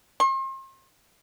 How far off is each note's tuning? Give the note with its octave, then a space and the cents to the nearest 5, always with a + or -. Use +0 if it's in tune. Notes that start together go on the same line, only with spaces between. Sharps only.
C6 +40